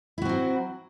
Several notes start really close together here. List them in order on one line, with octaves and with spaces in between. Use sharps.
E4 F#4 C4 F#3